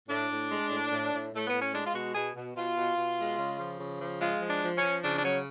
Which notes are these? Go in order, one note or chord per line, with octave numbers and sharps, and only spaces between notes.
A2 D4
A2
G#3
A2
A2
A2
A2 A3
B3
A2
C#4
G#3 D4
F4
B2 F#4
B2 G#4
B2
B2 F4
B2
B2
G#3
C#3
F3
C#3
F3
G#3 F4
F3
D4
F3
C#4
F3
C#3 D4
D4
F#3 C#4